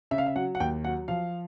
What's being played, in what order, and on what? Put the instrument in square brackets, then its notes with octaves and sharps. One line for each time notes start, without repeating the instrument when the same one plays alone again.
[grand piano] C#3 E5
F5
E5
F#3 F#5
F#5
D#2 G5
F#3 F#5
F3 F5